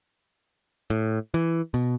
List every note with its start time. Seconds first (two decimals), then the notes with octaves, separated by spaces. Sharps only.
0.90 A2
1.34 E3
1.74 B2